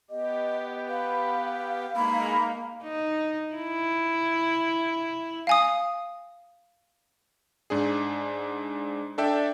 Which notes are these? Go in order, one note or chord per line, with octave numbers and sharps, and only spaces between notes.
B3 G4 D#5
B4 F5
G#3 A#3 D#4 A#4 B5
D#4
E4
F5 G#5 D#6
G#2 D4 G#4
D4 A4 D5 E5 G5